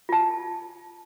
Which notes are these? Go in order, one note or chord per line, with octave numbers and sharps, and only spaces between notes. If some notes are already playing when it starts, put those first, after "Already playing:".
F4 A5